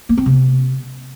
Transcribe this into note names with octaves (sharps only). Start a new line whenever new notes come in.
A#3
C4
C3